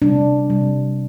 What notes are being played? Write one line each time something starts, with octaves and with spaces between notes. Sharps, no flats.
C3 G3 D4
C3 G3